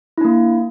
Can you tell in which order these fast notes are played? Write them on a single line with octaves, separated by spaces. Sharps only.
E4 D4 A#3